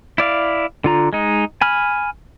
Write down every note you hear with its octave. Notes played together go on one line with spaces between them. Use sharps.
E4 D5 F5
D3 F4 A#5
G#3 D#4
G#5 B5 F6